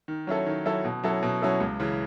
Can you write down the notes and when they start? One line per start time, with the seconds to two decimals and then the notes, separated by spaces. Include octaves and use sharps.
0.08 D#3
0.27 F#3 C#4 E4 A4
0.47 D#3
0.65 F#3 C#4 E4 A4
0.85 B2
1.04 F#3 C#4 E4 A4
1.23 B2
1.42 F#3 C#4 E4 A4
1.60 C#2
1.80 C#3 E3